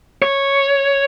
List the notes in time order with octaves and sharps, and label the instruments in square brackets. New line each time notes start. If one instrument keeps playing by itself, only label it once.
[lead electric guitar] C#5